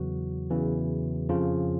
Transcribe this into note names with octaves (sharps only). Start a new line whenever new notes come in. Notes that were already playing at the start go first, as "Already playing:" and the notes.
Already playing: E2 C#3 E3 F#3 F#4
E2 C#3 E3
F2 C#3 F3 F4